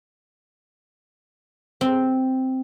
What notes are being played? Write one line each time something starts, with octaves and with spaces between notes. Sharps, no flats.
C4